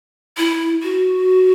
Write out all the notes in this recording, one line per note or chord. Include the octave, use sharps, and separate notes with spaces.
E4
F#4